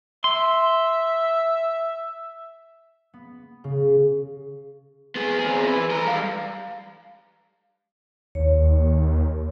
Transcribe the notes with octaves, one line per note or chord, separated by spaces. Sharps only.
E5 C6
B3
C#3
B3 G#4
C4 G#4
E3 B4
A4 A#5
G3 F5
D#2 C#5